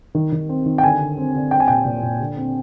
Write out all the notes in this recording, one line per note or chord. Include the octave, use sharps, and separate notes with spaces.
D#3
D#3
C4
D#3
G5
D3 G#5
D3
C4
D3
C4 G5
G#5
A#2 G5
A#2
A#2
D3
C4